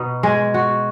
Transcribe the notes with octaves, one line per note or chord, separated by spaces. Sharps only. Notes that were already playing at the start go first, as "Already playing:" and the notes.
Already playing: B2 D#4
G#3
F#4